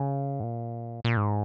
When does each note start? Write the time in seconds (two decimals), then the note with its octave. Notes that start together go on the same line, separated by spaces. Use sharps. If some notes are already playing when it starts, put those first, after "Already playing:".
Already playing: C#3
0.40 G#2
0.43 A#2
1.04 A#2
1.17 G#2